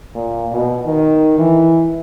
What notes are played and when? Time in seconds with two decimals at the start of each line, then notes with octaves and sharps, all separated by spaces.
0.15 A#2
0.52 B2
0.85 D#3
1.38 E3